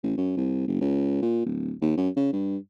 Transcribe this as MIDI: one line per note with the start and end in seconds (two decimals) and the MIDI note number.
0.03 0.15 33
0.17 0.36 42
0.37 0.66 36
0.68 0.78 30
0.81 1.18 37
1.22 1.43 46
1.46 1.72 26
1.82 1.93 39
1.97 2.09 42
2.17 2.32 49
2.33 2.57 43